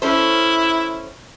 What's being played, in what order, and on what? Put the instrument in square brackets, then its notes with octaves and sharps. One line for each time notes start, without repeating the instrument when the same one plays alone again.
[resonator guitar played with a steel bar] C#4 A4 C5 [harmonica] E4